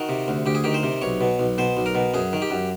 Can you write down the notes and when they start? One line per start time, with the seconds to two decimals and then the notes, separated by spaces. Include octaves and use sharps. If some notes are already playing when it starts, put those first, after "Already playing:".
Already playing: D#3 F#4
0.09 C3
0.28 D2
0.46 D2 G4
0.55 G#4
0.64 D#3 G4
0.74 C5
0.83 C3
1.02 B1 C#5
1.21 B2
1.39 B1
1.58 B2 C5
1.77 B1
1.86 A#4
1.95 B2
2.14 F#2 G#4
2.33 D#3
2.42 G4
2.51 F#2